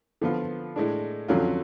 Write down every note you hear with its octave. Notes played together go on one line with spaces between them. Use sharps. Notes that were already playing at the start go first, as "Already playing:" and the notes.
D3 F3 B3 F4
A2 G#3 D4
F2 D3 F#3 C#4 F4